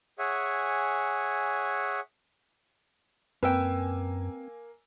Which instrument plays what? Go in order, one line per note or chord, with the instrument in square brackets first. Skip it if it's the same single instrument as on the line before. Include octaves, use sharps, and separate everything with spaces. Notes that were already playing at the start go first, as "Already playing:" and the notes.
[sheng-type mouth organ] G#4 C#5 E5 F#5 G#5
[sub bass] F#2 [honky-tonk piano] A#3 G#5 E6 [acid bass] C4 [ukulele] B4 G5